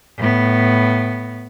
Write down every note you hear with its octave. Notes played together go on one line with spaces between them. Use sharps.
A2 B3